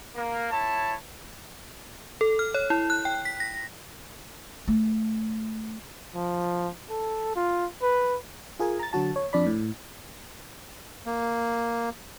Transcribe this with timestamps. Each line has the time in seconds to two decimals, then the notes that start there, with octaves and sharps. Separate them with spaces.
0.16 A#3
0.51 E4 C#5 A5
2.21 A4
2.39 F6
2.54 C#5
2.70 E4
2.90 F#6
3.05 G5
3.25 B6
3.40 A#6
4.68 A3
6.15 F3
6.90 A4
7.36 F4
7.82 B4
8.59 F4 G#4 A#4 G#5
8.79 A#5 A6
8.93 D3 F#3 F#4 A5
9.16 C#5
9.33 F2 D4 D5 B5
9.46 A2
11.06 A#3